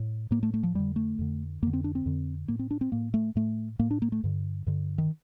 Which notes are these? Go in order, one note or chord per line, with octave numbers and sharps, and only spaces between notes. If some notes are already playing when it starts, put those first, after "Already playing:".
Already playing: A2
A2 A#3
A3
A3
F3
F2 D3 G3
A3
F2 D3
F2 D3 A#3
C4
D4
C4
F2 D3
A2 A#3
C4
D4
C4
A2 A#3
A3
A2 A3
A2 A#3
D4
A#3
A3
G2 D3
G2 D3
D#3